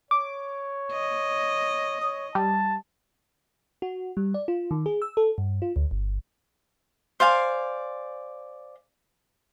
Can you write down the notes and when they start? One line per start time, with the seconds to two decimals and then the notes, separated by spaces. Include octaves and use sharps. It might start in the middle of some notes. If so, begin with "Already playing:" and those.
0.11 C#5 D6
0.92 D#5
2.01 C#5 D#6
2.35 G3 A5
3.82 F#4
4.17 G3
4.34 D5
4.48 F4
4.71 D#3
4.86 G#4
5.02 E6
5.17 A4
5.38 G2
5.62 F4
5.76 D2
5.91 G1
7.20 C5 D5 F5 G#5